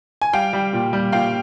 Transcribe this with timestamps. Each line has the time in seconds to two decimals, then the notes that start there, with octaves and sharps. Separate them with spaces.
0.22 G#5
0.33 G3 F5 G5
0.53 G3
0.73 A#2
0.93 G3
1.12 A#2 F5 G5